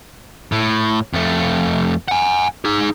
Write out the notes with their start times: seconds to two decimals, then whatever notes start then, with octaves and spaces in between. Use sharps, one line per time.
0.52 A2
1.13 F2 A3
2.08 F#5 G#5
2.65 D#4 G#4